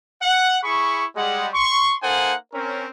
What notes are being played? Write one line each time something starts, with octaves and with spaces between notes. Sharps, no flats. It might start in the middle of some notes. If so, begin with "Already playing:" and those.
F#5
E4 G#4 B5 C#6
G3 G#3 F#5
C6 C#6
A#3 D#4 A4 C5 F#5 G#5
C4 C#4 A#4